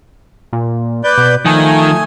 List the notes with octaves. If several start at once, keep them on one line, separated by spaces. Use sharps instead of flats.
A#2
B4 D5 G6
B2
D#3 F3 A3 G#5 D#6